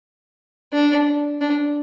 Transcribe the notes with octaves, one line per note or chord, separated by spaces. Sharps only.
D4
D4